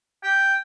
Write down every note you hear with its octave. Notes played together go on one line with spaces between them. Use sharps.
G5